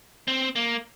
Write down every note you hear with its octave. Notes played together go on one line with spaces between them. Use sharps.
C4
A#3